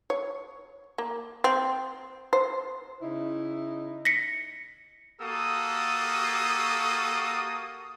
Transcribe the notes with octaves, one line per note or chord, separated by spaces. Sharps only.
C#5
A#3
C4
C5
C#3 D#4 E4
A#6 B6 C#7
A#3 F#4 G4 A4 D#6